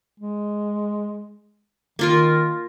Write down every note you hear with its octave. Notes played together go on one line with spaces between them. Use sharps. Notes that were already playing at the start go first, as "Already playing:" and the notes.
G#3
D#3 A#3 F4 A#4